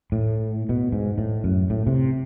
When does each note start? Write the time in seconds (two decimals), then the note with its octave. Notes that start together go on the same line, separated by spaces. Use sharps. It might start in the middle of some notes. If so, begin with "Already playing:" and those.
0.12 A2
0.69 B2
0.92 G#2
1.18 A2
1.44 F#2
1.70 A2
1.87 C3